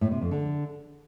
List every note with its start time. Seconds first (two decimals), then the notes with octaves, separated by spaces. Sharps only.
0.01 A2
0.11 C3
0.21 F2
0.31 D3